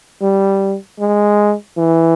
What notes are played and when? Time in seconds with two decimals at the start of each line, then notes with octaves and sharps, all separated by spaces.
0.22 G3
1.00 G#3
1.78 E3